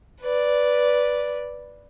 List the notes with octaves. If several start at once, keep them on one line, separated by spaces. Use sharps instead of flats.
B4 D5